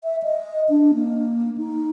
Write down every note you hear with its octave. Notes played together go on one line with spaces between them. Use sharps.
E5
D#5
D4
A#3
D#4